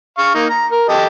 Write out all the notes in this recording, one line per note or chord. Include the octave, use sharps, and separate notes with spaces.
F5 C#6
A#3 D#4
A#5
A#4
G4 A4 D#5